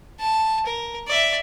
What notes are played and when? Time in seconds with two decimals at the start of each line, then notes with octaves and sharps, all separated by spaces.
0.19 A5
0.66 A#4
1.08 D5 E5